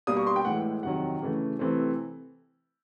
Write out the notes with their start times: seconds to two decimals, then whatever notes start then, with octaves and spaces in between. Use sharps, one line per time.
0.07 B2 G3 A#3 D#6
0.17 C#6
0.27 C6
0.36 G5
0.45 A2 E3 G#3 F#5
0.83 F2 C3 D#3 F#3 F#5
1.22 C#3 E3 A3
1.59 C3 E3 A3 C4